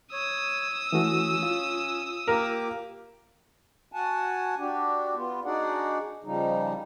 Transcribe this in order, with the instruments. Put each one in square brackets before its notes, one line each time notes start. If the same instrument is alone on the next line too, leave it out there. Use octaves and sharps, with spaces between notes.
[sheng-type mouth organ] C#5 [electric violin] D#6 E6
[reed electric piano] E3 A3 F#4 [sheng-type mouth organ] C#4
[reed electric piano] F4
[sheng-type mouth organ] A#3 G4 D6 [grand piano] A#4
[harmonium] F#4 F#5 G#5 A5
D4 F#4 G4
B3 F4
D4 D#4 F#4 G#4 D5 F#5
C#3 F3 G3 D#4